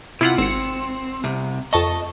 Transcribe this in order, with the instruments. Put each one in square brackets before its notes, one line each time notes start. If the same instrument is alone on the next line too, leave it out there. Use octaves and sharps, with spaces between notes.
[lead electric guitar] C3 [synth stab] E4 F4 F#5
[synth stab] G#1 C#7 [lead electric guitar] C4
[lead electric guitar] C2 C3
[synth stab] F2 A5 C#6 [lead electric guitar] D#5